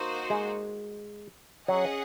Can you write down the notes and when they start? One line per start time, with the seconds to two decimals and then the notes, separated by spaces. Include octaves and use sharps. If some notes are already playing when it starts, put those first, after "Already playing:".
Already playing: A#3 D#4 F#4 C5
0.30 G#3
1.68 F#3 C#4 G#4 D#5 F#5